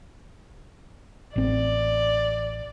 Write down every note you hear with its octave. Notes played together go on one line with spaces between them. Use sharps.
A1 C4 D5